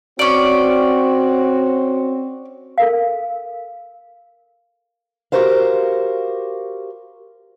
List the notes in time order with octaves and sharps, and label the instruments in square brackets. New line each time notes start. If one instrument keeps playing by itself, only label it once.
[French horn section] C4 F#4 [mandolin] C#4 D5
[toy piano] A4 A#4 F5
[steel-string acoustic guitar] F#4 G4 A#4 C5 F5